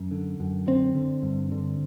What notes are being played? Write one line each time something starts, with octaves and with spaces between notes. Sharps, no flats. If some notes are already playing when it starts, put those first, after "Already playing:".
Already playing: F#2
D3
F#2
D3 C4
D3
G2
D3